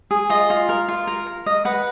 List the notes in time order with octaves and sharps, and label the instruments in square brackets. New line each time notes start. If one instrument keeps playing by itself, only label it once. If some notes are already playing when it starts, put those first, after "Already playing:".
[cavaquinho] G#4
F4 D#5
F4
A#4
F4
A#4
A#4
D#5
B4 F#5